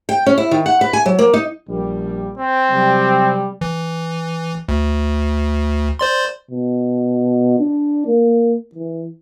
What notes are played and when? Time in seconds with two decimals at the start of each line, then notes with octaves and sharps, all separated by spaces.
0.09 G5
0.26 C#4
0.38 E4
0.51 D#3
0.66 F#5
0.81 B4
0.93 G#5
1.06 F#3
1.19 A#3
1.34 D#4
1.68 A#1 G3
2.38 C4
2.69 C3 F#3 G3
3.61 E3
4.69 D2
5.99 C5 D5 C6
6.51 B2
7.59 D4
8.07 A#3
8.75 E3